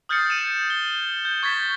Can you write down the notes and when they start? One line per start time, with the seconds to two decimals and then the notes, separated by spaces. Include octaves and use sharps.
0.09 D#6 F6 G6 A6 C7 C#7
0.30 C#7 D#7 E7
0.70 G7
1.25 G6
1.43 C#6 G#6 A6 B6 G7